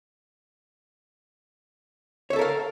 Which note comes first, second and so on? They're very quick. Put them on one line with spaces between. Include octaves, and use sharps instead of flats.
C#5 E5 A4 A#4 F5